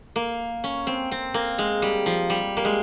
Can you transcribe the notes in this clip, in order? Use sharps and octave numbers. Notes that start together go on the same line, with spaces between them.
A#3
C#4
C4
C4
A#3
G#3
G3
F3
G3
A#3
G#3